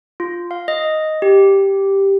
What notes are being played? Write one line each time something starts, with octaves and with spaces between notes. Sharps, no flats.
F4
F5
D#5
G4